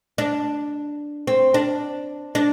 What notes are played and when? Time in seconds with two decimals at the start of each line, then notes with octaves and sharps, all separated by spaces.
0.18 D4
1.27 C4
1.54 D4
2.35 D4